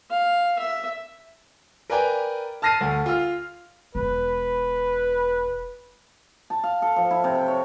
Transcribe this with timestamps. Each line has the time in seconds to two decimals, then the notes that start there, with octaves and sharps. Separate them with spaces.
0.11 F5
0.59 E5
1.90 A#4 B4 D5 G5 G#5 A#5
2.62 A5 F6 A6 A#6 C7 D#7
2.81 D2
3.06 F4 F6
3.95 E1 B4
6.50 A5
6.64 F5
6.82 A4
6.96 F3
7.11 E4
7.24 C3
7.35 G5
7.48 C#5